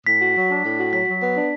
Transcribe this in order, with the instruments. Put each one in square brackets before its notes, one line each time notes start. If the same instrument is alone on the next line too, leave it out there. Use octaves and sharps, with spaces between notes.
[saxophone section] A2 [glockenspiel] B6
[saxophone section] F#4
F#3
D4
A2
F#4
[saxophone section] F#3 [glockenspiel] B6
[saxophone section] F#3
B3
D4